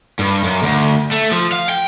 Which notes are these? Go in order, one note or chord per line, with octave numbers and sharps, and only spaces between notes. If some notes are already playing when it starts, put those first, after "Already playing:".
G2
F#2
D2
A3
F3
F5
G5